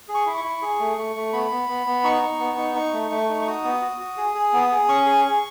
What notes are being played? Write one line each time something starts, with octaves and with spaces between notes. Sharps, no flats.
G#4
C#6
E4
C#6
E4
G#4
A3
A3
A3
B3 B5
B3
B3
B3
D#4 C#6
D#4
B3
D#4
D#4
A3
A3
D#4
C#6
F#4 D#6
B3
F#4
F#4
G#4
G#4
B3
G#4
C#4 C#6
G#4
G#4